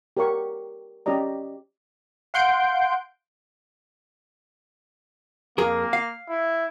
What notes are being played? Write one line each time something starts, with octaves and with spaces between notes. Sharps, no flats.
G4 A#4 C#5 F5 C#6
C#4 G4 D5 D#5 A#5
F5 F#5 C6 G6 D7
F2 A#3 G#4 A#4
F5
E4